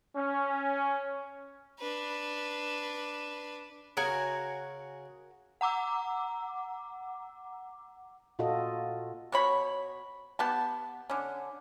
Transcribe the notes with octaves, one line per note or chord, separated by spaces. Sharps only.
C#4
D4 B4
C#3 F#4 A#4 G#5
F#5 A#5 D6 E6
A#2 F4 F#4 A4 D#5
B2 C#5 B5
B3 G4 A5
D3 C#4